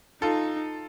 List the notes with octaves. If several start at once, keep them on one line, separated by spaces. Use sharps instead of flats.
D#4 F4 A4